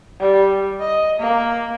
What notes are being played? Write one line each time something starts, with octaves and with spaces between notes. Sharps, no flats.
G3
D#5
A#3